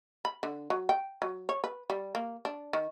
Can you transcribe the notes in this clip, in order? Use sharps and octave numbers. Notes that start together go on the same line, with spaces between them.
B5
D3
F#3
G5
F#3
C#5
B4
G3
A#3
D4
D#3